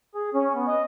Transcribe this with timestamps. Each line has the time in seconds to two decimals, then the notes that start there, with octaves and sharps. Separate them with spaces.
0.15 G#4
0.34 C#4
0.55 B3
0.68 D#5